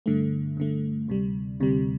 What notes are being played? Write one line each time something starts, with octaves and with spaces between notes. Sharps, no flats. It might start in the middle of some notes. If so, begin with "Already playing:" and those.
G2 D3 A3
G2 D3 A3
D2 C3 G3
D2 C3 G3